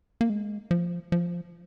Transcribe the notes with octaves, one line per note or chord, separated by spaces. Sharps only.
A#3
G#3
F3
F3